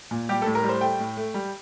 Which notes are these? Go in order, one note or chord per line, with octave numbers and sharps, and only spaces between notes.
A#2
G3 G4
A2 A4
A#4
G3
C5
A3 G5
A2
A3
G3